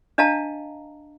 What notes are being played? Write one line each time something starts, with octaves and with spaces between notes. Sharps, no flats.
D4 D#5 F5 A5 A#5